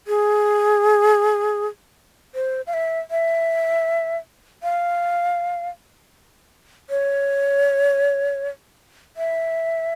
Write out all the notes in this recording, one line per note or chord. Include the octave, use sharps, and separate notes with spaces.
G#4
C5
F5
E5
E5
F5
C#5
E5